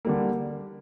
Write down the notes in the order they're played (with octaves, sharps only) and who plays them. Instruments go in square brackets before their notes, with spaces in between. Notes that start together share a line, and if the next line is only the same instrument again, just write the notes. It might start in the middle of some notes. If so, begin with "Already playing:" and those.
[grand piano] D3 G3 A#3